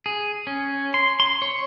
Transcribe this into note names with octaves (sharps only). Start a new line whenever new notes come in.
G#4
C#4
C6
C6
C#5